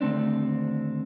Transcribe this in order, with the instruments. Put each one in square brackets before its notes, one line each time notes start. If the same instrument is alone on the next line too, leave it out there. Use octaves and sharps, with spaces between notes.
[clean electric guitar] D#2 D3 A3 C4 D4